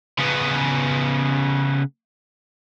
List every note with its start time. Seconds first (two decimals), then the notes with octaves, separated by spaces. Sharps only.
0.18 C#3 B3